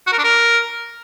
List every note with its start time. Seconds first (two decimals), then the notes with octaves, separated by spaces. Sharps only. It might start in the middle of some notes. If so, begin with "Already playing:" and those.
0.07 F#4
0.13 A#4
0.18 D4
0.24 A#4